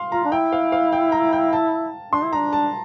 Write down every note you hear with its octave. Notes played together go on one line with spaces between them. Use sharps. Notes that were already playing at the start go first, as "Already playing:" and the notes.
Already playing: F5 C6
F4 A#5
D4
E4 G5
F5
F5
G5
A#5
G5
A5
D4 C6
E4
D4 A#5
A5